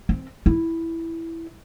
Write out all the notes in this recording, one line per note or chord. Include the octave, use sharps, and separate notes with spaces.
C4
E4